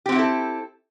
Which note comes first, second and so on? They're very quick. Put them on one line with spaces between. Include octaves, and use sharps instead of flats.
G4 C4 F#4 E4 A4